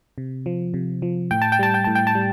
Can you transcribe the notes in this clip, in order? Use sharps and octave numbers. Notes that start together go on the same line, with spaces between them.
C3
F3
C3
F3
A2 G5
A5
G5
G3 A5
G5
A2 A5
G5
A5
G3